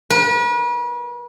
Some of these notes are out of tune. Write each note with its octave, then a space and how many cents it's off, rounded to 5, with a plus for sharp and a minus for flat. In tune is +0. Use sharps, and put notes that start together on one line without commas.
B4 -40